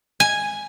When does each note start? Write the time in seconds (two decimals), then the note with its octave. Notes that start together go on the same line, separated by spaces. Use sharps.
0.20 G#5